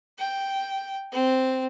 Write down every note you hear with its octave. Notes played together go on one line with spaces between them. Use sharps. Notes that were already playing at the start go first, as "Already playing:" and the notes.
G5
C4